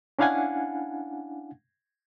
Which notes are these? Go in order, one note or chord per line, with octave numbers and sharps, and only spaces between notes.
C#4 D4 E4 F5 F#5 G#5